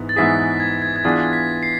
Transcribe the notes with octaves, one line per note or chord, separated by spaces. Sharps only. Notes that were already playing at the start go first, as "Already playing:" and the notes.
Already playing: G#2 E3 B3
A6
G#2 E3 B3 E4 G#4 B6
A6
G#6
G#6
G#6
E3 B3 D4 F4 G#4 A6
B6
C7